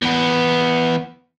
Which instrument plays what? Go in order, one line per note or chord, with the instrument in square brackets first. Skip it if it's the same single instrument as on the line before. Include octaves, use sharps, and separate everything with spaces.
[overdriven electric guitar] E2 B3